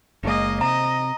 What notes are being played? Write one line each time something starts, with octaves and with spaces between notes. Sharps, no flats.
F#1 G#3 A#3 D#5
C3 D#5 A#5